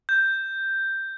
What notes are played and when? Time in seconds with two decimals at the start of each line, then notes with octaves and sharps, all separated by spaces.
0.09 G6